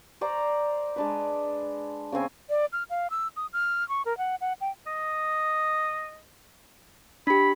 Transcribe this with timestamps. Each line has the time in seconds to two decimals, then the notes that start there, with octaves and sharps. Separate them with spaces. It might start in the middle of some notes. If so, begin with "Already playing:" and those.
0.21 C5 D5 A#5
0.96 G#3 D4 B4
2.12 C#3 B3 C4 G#5
2.50 D5
2.73 F6
2.90 F5
3.10 E6
3.36 D#6
3.53 F6
3.89 C#6
4.06 A#4
4.18 F#5
4.41 F#5
4.61 G5
4.86 D#5
7.27 D4 G4 B5